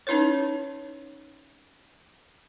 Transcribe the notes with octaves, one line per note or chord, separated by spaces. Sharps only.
C#4 D#4 E4 B4 C#5